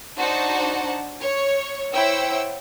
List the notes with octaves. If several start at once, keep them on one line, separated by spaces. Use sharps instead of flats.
D4 D#4 F#4 C5 F#5 A5
C#5
E4 C5 C#5 F#5 G5 E6